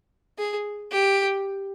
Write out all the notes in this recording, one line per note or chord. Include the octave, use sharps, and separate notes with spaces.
G#4
G4